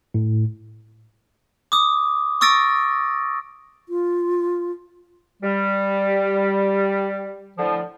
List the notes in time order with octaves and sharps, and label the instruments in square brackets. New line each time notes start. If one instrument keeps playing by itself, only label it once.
[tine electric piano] A2
[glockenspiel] D6 D#6
C#6 D#6 E6 A6 A#6 D7
[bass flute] F4
[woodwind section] G3
A2 D3 F3